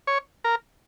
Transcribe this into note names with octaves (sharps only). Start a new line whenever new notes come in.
C#5
A#4